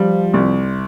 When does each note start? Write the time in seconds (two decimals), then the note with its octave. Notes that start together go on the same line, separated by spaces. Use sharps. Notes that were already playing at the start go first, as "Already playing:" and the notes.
Already playing: F3 G3
0.34 C2